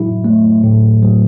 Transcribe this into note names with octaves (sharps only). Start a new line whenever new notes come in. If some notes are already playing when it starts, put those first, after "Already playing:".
Already playing: A2 F#3 E4
A3
A2
F#3